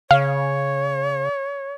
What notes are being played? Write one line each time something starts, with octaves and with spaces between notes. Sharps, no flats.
C#3 C#5 F5